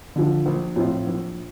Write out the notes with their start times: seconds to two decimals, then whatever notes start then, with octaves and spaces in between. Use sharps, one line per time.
0.16 D3 F3
0.46 A#1
0.76 A2 F3 C4 F4
1.07 A#1